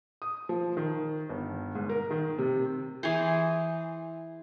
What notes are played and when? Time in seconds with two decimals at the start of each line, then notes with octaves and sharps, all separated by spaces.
0.22 D#6
0.49 F3
0.77 D#3
1.29 G1
1.75 G#2
1.89 A#4
2.11 D#3
2.38 C3
3.03 E3 G#4 C5